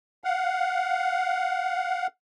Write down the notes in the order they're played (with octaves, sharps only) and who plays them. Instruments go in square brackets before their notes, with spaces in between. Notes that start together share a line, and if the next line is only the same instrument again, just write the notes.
[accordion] F5 F#5